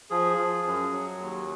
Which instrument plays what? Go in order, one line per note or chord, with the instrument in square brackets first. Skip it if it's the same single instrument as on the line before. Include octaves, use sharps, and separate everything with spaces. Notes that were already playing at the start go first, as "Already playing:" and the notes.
[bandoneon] F3 G#4
F3
F#2
F#3
D#2